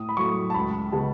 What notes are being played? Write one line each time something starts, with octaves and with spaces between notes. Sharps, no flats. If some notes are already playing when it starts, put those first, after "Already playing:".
Already playing: A2 D#6
B5
F#3 A3 C#6
A5
C#2 B5
C#3 G#3 B3 A5